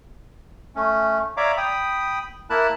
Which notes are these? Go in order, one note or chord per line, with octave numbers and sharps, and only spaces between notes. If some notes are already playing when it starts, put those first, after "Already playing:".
A3 C#4
C#5 D5 E5 F5 A#5 D6
G5 B5 D#6
A#3 E4 A#4 A5 B5 F#6